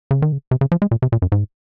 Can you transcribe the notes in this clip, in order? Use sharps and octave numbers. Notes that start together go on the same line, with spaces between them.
C#3
D#3
C#3
C3
C#3
F3
G#3
A#2
C3
A#2
F#2
G#2